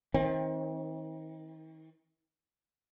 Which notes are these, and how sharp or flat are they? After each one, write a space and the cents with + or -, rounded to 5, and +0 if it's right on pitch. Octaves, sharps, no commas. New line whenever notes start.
D#3 +40 C4 +35